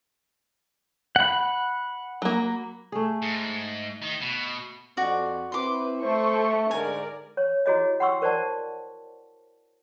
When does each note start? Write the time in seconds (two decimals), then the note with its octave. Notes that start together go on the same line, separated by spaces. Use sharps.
1.16 F#5 B5
2.22 F#3 A#3
2.92 A3 G#4
3.22 G#2
4.02 D#3 D#4
4.21 B2
4.97 F2 F#4 D5
5.52 C4 E4 B4 C6 D6
6.03 A3 C5 C#6
6.71 G#2 D3 A#4 D5 G#5
7.37 C#5
7.66 E4 F#4 G#4 C#5 D#5
8.00 F#5 G5 C6 C#6 E6
8.22 A#4 C5 D5 F#5 A5